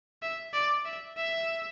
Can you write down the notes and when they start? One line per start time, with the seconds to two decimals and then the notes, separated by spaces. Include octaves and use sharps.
0.22 E5
0.54 D5
0.85 E5
1.17 E5